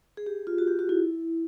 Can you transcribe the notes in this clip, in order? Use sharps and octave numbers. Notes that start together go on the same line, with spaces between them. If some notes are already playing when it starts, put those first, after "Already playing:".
G#4
G4
F4
F#4
G4
F#4
E4